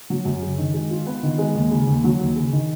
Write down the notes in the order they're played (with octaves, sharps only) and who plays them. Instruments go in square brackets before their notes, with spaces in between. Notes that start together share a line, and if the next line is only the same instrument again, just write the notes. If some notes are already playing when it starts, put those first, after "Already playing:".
[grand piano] F#3
F#2
C#3
D#3
G#3
F4
B3
D#3
G#3
D#2
C#3
D#2
F#3
D#2
C#3
D#3